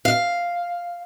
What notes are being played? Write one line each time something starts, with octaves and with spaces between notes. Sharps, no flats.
F5